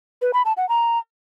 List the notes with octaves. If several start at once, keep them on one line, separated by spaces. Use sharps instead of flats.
B4
B5
A5
F#5
A#5